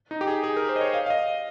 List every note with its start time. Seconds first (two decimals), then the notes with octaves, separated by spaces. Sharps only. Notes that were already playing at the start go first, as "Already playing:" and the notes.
0.11 D#4
0.21 G4
0.27 G#4
0.44 G#4
0.56 A#4
0.69 C5
0.76 D#5
0.81 C#5
0.94 F5
1.06 F5
1.10 D#5